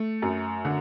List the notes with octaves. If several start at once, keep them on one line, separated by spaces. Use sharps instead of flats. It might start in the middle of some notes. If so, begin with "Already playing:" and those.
Already playing: A3
F#2
D3